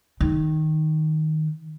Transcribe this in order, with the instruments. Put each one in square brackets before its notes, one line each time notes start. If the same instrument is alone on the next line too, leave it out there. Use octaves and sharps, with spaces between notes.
[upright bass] D#3